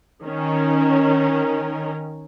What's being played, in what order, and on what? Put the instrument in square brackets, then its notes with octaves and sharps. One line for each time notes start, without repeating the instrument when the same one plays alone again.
[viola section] D#3 C#4 A#4